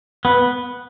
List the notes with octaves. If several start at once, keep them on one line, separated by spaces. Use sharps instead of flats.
B3